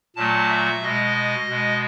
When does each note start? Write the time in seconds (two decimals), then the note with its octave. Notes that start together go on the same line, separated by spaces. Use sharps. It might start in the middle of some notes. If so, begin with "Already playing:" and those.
0.16 A#2 F#3 A3 A5
0.50 E5
0.83 B2 G#3 D#5
1.49 B2 G#3